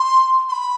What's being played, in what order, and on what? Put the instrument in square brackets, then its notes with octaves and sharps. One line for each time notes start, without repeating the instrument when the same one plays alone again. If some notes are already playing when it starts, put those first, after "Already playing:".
Already playing: [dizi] C6
C6
B5